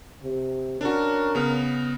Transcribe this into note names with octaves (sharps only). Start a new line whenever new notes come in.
C3
C#4 D4 F#4 A#4
C#3 B3